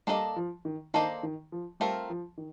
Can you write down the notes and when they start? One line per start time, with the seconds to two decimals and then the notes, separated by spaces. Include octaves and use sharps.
0.07 G3 A#3 D4 A4 C5 D#5
0.36 F3
0.65 D#3
0.94 D#3 A#3 D4 A4 C5 D#5
1.23 D#3
1.52 F3
1.80 G3 A3 C4 F4 A#4
2.10 F3
2.37 D#3